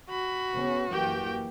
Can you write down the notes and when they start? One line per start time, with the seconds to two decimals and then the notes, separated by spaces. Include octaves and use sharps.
0.10 F#4 B5
0.53 C#3 B3 C#4
0.91 F#2 E3 A#3 G4 G5